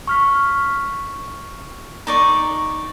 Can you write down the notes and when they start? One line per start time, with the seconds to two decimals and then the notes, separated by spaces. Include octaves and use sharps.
0.07 C#6 F6 B6
2.07 D#4 D5 A#5 C#6